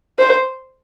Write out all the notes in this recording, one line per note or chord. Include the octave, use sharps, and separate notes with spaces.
C5